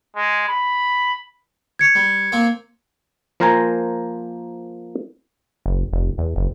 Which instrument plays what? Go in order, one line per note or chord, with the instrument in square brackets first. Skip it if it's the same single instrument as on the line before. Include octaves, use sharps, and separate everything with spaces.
[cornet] G#3
B5
[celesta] G#6 C#7
[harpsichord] G3
A#3 C4
[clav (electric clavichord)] F3 A#3 A#4 C5 G#5 A#5
[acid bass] F#1
F1
E2
F#1